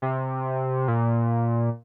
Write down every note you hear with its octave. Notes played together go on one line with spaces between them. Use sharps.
C3
A#2